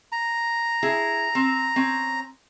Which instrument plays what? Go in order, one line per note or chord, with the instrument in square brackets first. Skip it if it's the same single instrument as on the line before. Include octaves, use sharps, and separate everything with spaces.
[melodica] A#5
[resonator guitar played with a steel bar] E4 G#4
C4
C4 C#4